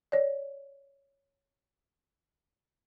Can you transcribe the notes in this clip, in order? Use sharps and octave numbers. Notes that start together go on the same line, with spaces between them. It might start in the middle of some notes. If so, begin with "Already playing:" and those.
C#5 D5